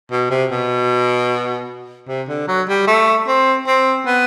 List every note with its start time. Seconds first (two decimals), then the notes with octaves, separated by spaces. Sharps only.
0.11 B2
0.30 C3
0.51 B2
2.08 C3
2.29 D3
2.48 F#3
2.68 G3
2.87 A3
3.27 C4
3.67 C4
4.06 B3